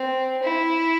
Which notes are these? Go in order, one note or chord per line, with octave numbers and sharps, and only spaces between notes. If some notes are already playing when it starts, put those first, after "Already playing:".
Already playing: C4
E4